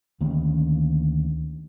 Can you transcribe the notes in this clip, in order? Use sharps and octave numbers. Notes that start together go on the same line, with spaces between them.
D2 D#3 A#3 C#4